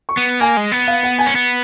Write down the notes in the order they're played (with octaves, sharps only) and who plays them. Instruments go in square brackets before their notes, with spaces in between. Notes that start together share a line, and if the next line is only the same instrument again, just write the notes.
[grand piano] C#6
[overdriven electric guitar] B3
[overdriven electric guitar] A#3 [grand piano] G#5
[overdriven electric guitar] G#3
B3
[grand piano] F5
F#5
G#5
[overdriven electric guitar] C#4
B3